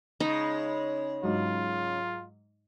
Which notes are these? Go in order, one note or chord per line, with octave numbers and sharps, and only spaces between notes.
C#3 G#3 D#4
G#2 F#3 F4